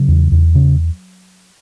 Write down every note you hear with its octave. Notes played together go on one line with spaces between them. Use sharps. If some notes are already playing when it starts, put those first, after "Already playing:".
Already playing: C#3 F#3
E2
E2
C#3